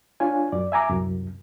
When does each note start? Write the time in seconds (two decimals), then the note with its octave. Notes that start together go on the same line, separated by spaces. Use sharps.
0.20 D4 F4 C#5 G#5
0.52 F#2 D5
0.72 E5 G#5 A#5 D6
0.90 C2 F#2